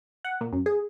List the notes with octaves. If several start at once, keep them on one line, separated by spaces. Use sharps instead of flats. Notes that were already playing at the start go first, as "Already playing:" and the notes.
F#5
A#2
F#2
G#4